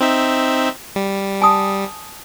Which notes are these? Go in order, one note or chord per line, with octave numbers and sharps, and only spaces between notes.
C4 D#4 E5
G3
G#5 A5 D#6